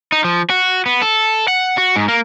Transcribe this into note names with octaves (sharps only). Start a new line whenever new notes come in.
D#4
F3
F#4
B3
A4
F#5
F#4
G#2
A#3